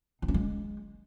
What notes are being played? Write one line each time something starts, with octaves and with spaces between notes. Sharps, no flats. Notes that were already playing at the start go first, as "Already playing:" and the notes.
D#4
C#4
G#3